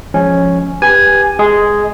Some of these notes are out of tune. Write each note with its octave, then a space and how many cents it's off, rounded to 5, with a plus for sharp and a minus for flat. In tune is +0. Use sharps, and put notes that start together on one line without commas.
F3 +0 G#3 +0 C#4 +0
G4 +20 B4 +0 G#5 +0
G#3 +0 G#4 +0